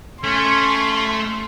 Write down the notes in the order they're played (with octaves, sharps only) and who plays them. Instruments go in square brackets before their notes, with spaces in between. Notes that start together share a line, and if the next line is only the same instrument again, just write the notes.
[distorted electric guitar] A3 [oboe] C#4 [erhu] C6